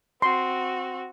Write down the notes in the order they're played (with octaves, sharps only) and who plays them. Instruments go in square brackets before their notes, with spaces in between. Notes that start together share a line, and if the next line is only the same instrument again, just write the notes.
[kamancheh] C4 F#4 [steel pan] C6